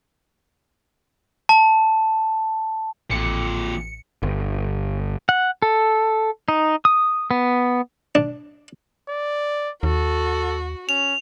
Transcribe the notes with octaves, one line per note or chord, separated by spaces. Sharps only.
A5
A1 F2 A#2 C#7
G1
F#5
A4
D#4
D#6
B3
D4
D5
D#2 F#4 A4
C#4 F7